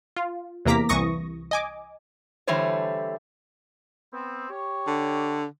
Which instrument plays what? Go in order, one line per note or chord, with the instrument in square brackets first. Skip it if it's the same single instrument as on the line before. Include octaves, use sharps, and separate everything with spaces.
[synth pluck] F4
E2 C3 A#3 A#5 D6 B6
C2 E3 C#6 D#6 A#6
D#5 G#5 D6
[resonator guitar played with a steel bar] D3 E3 G3 A3 C5 C#5
[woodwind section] B3 C4
G4 C#5
[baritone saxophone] D3